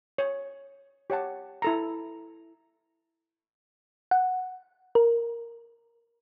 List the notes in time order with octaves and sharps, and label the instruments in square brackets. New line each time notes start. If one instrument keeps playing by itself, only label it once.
[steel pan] C#5
G4 C#5 F#5 A5
E4 A4 A#5
[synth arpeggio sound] F#5
A#4